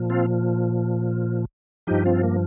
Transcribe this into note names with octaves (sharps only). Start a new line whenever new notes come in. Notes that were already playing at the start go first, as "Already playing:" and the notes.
Already playing: A#2 F3
C4 F4
G2 F3 D#4 G4
C4 F4
A#3